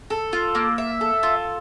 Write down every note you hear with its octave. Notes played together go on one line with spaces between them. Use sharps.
A4
F4
A#3
E5
A4
F4